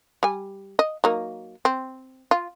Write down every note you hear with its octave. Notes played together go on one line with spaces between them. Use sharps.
G3 G#5
D#5
F#3 A#3 D#4
C4
F4